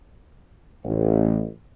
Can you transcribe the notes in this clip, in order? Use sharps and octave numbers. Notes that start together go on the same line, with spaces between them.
A1